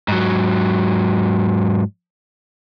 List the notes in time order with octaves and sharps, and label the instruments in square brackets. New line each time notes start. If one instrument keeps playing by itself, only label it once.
[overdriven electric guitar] G#2 F#3